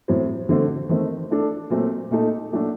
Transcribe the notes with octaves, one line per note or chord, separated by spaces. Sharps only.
A2 F#3 C4
D3 A3 C4 F#4
D#3 A3 C4
A3 D4 A4
A#2 F#3 A3 C4
A#2 A3 D#4 A4
A#2 F#3 A3 D4 F#4